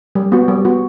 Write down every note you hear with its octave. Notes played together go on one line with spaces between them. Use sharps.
G3
B3 F#4
G3
B3 F#4